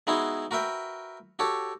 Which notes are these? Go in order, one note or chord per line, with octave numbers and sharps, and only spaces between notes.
G#3 B3 D#4 E4 F#4 G#4
F#4 A#4 B4 E5 G5
F#4 G4 A4 C#5